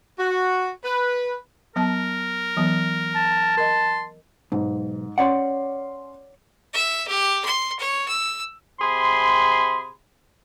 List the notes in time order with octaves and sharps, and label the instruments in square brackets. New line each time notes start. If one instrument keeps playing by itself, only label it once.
[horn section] F#4
B4
[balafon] F#3 B3 A5 [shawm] A#4
[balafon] E3 F#3 B3
[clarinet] A5
[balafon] A#4 D#5 [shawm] C6
[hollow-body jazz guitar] B1 [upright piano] G#2
[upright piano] C#4 C6 [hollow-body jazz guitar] C#5 D5 F#5
[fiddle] E5
G4
C6
C#5
E6
[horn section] C3 G#4 B5 C6